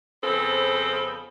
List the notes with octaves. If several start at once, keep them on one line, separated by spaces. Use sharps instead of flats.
F2 C#3 B3 C4 A4 C5